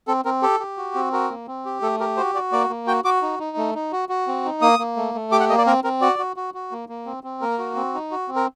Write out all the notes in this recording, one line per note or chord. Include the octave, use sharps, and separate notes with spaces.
C4 A4
C4 A#4
G4 A4
G4
F#4
C4
F#4 A#4
A#3
C4
G4
A3 A4
G4 A#4
F#4 C5
F#4 D5
A#3 D5
A#3
F#4 G5
F#4 D6
D#4
D#4
A3
D#4
F#4
F#4
C4
D#4
A#3 D#6
A#3
A3
A3
G4 D6
F#5
A#3 D#5
D5
C4 A#4
C4 A#4
F#4 D5
F#4
F#4
F#4
A#3
A#3
C4
C4
A#3 A#4
F#4
C4
D#4
F#4
C4
A#4